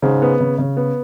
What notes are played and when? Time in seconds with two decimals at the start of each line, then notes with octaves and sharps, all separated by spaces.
0.02 G#2 C#3
0.22 B3
0.40 C#3
0.58 C#3
0.77 B3